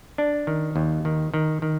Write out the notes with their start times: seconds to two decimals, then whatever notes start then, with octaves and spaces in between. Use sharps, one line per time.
0.18 D4
0.47 D#3
0.76 D#2
1.05 D#3
1.34 D#3
1.62 D#3